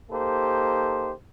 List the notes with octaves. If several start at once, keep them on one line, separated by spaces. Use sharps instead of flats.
A#3 D#4 G4 A4 C5